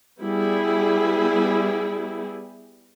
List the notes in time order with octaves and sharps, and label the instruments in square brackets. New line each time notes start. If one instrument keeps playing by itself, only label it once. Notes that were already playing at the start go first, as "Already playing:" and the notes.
[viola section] G3 B3 E4 G#4